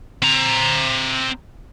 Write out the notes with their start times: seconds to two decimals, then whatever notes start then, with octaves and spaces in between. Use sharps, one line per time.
0.22 C4 A#5